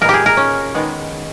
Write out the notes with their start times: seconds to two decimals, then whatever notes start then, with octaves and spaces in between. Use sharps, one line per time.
0.01 A#2 G#3 B3 A#4
0.09 G4 G#4
0.26 A#4
0.37 C#4
0.75 D#3 G#3 B3